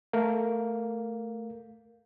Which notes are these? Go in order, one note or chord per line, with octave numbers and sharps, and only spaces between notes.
A3 A#4 F5